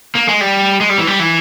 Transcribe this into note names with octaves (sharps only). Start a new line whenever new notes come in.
A#3
G#3
G3
G#3
G3
E3
G3
E3